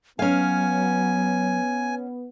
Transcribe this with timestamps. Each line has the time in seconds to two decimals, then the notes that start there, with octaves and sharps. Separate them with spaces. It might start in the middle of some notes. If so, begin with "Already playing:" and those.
0.19 F#3 B3 C#4 F5 G#5